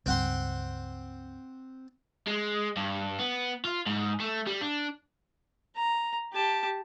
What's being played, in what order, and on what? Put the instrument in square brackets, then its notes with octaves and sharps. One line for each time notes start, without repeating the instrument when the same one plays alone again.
[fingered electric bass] C#2 G2 [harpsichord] C4 F#5 C6
[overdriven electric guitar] G#3
G2
B3
F4
G#2
A3
G3
D4
[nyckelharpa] A#5
G4 A5